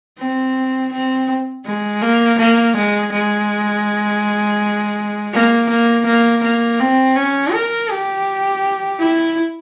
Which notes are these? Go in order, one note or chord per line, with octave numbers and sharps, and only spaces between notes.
C4
C4
G#3
A#3
A#3
G#3
G#3
A#3
A#3
A#3
A#3
C4
C#4
A#4
G4
E4